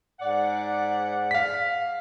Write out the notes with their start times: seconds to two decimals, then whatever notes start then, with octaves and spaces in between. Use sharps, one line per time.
0.20 G#2 D5 F#5
1.31 F5 B6